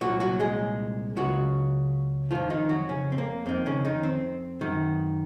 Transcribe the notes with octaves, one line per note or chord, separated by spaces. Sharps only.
C2 A#2 F#3 F#4
F#3 F#4
G#3 G#4
C#2 C#3 F#3 F#4
F2 D#3 F3 F4
D#3 D#4
F#3 F#4
C#3 C#4
C4
A#3
F2 D#3 C4
C#3 C#4
D#3 D#4
C4
F#2 D#3